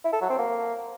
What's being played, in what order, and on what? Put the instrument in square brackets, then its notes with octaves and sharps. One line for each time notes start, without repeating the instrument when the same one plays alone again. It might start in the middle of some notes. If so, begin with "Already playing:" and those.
[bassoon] E4
A4
F#3
C4
A#3